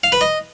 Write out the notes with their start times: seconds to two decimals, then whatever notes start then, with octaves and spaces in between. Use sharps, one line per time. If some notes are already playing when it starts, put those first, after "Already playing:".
0.04 F5
0.12 B4
0.21 D#5